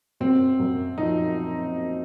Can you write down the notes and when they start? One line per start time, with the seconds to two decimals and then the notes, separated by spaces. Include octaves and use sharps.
0.20 F#2 C4
0.60 F#2
0.98 F3 D#4